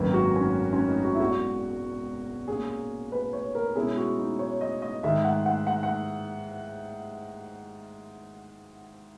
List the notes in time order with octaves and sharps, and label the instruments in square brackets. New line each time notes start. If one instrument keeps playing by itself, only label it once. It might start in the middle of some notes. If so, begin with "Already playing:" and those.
Already playing: [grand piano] G#1 F#2 D#3 F#3 A#3 [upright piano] B4
[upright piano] F#4
C#4
C#4
D#4
F#4
E4
[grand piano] E1 E2 B2 F#3 [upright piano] F#4
[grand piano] A#2 A#3 C#4 [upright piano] G#4
[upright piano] B4
C#5
A#4
[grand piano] B2 G#3 C#4 E4 [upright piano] G#4
[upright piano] F#4
D#4
C#5
D#5
D#5
[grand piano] G#2 D#3 G#3 [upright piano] E5
[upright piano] F#5
F#5
F#5
F#5